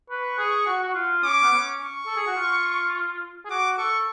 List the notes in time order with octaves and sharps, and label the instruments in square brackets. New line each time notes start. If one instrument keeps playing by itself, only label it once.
[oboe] B4 [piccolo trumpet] C#6
[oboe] G#4
F#4
F#4
F4
[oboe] C#4 [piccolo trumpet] D6
[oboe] B3
C#4
[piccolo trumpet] C#6
[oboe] A4
G#4
F#4
F4
G#4
[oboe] F#4 [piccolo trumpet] D6
[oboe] A4 [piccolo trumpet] C#6